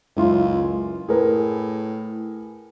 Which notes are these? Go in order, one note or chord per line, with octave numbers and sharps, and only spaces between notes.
C#2 F#2 E4 F4
A2 G#4 A#4 B4